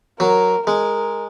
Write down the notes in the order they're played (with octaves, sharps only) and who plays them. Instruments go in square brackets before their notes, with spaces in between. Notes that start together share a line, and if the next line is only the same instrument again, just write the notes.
[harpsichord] F#3 [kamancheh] A#4
[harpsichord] G#3 [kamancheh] A#4